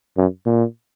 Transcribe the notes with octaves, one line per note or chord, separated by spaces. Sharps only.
F#2
A#2